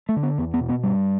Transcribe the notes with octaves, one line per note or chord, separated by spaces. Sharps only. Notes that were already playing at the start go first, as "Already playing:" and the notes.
A3
D3
B3
E2 B3
B3
B2
B3
G2 G3